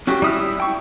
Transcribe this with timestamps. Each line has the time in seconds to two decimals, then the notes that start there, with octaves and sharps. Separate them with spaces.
0.07 C#4 F#4 G4
0.22 G3 E4 D#6 F6
0.60 G5 C#6